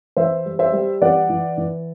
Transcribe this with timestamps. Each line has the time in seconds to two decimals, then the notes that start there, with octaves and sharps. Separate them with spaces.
0.17 E3 C5 E5
0.46 G3
0.59 C5 E5
0.73 G3
1.01 E3 D5 F#5
1.29 E3
1.58 E3